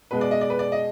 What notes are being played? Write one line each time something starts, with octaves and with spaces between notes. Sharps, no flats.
B2 G#3 B4
D5
D#5
D5
B4
D5
D#5